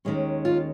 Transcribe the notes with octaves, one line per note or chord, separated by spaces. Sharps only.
D#2 D#3 G#3 C#4
F4